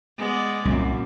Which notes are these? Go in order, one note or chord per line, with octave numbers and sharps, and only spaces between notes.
G#3 B3 D5
C2 F#2 A#2